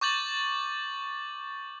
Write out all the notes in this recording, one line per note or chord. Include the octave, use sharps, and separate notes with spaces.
C#6 D6 G6 A6 F#7